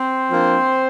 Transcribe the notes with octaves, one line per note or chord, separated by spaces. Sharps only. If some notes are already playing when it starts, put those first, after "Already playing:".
Already playing: C4 C5
F3 A#3 D4